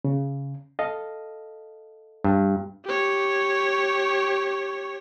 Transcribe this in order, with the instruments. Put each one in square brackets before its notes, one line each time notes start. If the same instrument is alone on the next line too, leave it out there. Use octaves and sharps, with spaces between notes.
[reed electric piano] C#3
A4 D#5 F5
[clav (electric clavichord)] G2
[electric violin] G4 C#5